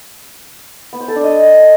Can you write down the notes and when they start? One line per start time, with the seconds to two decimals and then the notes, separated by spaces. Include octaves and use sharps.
0.93 B3
1.00 C5
1.08 A4
1.16 D4
1.24 D#5